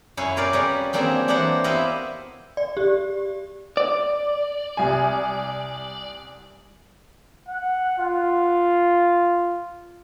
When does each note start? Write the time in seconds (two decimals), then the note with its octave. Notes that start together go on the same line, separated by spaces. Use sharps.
0.17 F#2 E4 C#5 F5 G#5
0.36 G4 A#4 D5 F5
0.53 G3 C#4 G#4 B4
0.93 F#3 G3 A#3 C4 D4 G#4
1.28 E3 D4 G4 C5 F#5 A#5
1.64 B3 C4 E4 G4 D#5 F5
2.57 D5
2.77 G4
3.77 D5
4.77 C2 G#5
7.49 F#5
7.99 F4